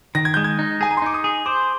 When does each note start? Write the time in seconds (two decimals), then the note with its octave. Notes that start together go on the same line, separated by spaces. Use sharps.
0.15 D#3 A#6
0.25 G#6
0.34 G#3 G6
0.44 G#6
0.59 D#4
0.81 G#4 G#5
0.90 A#5
0.97 C6
1.02 D#4 D6
1.14 D#6
1.24 G#4
1.46 C5 D6